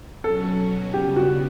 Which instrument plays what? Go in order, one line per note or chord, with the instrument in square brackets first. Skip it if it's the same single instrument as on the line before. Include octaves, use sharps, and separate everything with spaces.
[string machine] B2 F#3 C#4 F#4 [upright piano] A4
[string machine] C#3 G3 B3 [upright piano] G4
[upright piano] F#4